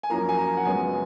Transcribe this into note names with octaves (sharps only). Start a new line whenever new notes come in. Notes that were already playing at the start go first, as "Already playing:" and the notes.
G#5
F#2 F3 A#3 A#5
G#5
A#5
F#5
F#2 C#3 G#3 B3 G#5